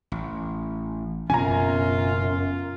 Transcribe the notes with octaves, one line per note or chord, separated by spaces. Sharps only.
A1
F#1 F#2 B2 C#4 F4 G#5 A#5